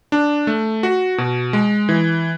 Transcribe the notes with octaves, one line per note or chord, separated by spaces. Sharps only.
D4
A3
F#4
B2
G#3
E3